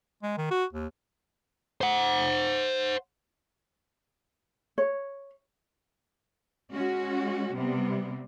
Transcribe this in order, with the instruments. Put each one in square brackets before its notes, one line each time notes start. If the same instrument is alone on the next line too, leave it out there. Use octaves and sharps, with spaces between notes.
[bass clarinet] G#3
D#3
F#4
D#2
[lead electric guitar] C5 F#5
[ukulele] C#5
[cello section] G#3 C#4 F#4
C3 G3 B3